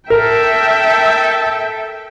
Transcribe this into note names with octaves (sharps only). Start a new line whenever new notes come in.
A4 A#4 E5 G5